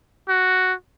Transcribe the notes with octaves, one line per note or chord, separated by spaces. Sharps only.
F#4